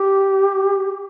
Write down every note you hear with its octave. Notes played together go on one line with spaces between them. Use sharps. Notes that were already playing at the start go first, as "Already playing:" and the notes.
Already playing: G4